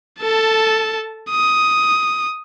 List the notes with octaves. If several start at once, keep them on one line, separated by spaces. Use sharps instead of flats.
A4 A5
D#6